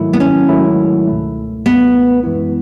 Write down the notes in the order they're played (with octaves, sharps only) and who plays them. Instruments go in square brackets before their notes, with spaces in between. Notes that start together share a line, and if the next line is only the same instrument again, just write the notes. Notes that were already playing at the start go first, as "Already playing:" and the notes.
Already playing: [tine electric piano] G#2 D#3 F#3 A3 E4
[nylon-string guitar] B3
C#4
[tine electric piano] G#2 D#3 F#3 A3 E4
C#2 B2 A3
[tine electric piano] C#2 B2 A3 [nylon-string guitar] B3
[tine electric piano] F#2 E3 G#3 B3 E4